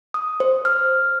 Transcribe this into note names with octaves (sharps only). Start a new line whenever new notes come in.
D#6
C5
F6